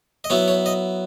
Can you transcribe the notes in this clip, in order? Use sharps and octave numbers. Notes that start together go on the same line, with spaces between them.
D#5
F#3 B3 E4 C#5
C#5
D#5